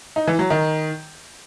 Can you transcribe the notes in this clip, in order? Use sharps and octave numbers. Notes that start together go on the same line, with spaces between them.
D#4
E3
F#3
D#3